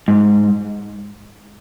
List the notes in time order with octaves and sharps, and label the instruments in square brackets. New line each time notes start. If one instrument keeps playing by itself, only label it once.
[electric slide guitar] G#2